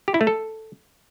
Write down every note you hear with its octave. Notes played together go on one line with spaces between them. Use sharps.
G4
E4
A3
A4